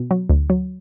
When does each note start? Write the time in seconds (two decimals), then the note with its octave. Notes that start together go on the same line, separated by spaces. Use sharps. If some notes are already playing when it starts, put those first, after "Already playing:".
Already playing: B2
0.11 F#3
0.30 D2
0.50 F#3